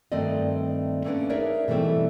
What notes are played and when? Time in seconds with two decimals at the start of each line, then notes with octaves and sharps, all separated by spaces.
0.12 G2 D#3 A3 C4 D5 D#5
1.04 A3 A#3 C#4 D4 B4
1.29 D#4 G#4 A#4 C#5 D5 E5
1.68 B2 E3 G3 A3 C4